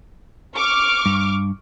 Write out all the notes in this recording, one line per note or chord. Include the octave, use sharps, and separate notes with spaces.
C#6 D6 F6
G2